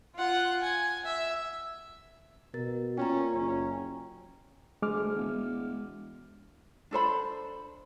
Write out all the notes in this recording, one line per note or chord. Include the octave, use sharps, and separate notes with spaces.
F4 F#5
G#5
E5
B2 A#4 A6
A#2 C#4 G5 A#5
F#1 C#4
D2 G#3 D6 F6
E1
D4 A4 C5 B5